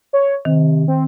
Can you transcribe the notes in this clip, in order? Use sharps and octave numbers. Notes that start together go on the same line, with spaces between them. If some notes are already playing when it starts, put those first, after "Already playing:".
C#5
C3 D#3
C4